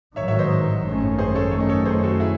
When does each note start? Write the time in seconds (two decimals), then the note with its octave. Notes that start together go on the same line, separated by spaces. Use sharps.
0.16 A1 G#2 D#3 F#3 C#5 E5
0.28 C#5 E5
0.39 C5 D#5
0.85 G#1 F#2 D#3 A3 C#4
1.18 G#4 C5
1.35 A4 C#5
1.52 F#2 D#3 A3 C#4 C#5
1.60 D#5
1.69 A4 C#5
1.86 G#4 C5
2.03 F#4 A4
2.20 E4 G#4